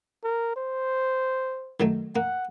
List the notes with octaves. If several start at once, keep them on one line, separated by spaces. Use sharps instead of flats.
A#4
C5
D#3 F#3 A3
A#3 F#5